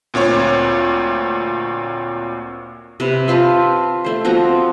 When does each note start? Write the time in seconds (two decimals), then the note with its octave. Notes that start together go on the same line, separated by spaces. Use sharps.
0.14 D2 A#2 C4 C#5
3.00 C3 B4
3.28 C4 F4 B4 A5
4.04 A3 C5
4.25 F3 C4 F#4 A#5